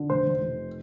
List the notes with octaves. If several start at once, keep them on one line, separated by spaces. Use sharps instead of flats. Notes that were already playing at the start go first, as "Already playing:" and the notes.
Already playing: D3
F1 C5
F1
F1